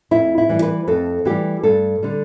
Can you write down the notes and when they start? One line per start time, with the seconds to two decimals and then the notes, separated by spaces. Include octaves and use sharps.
0.11 F2 E4
0.38 E4
0.49 E3 G3
0.62 B4
0.87 F2 A4
1.25 E3 G3 G4
1.63 G2 A4
2.03 D3 G3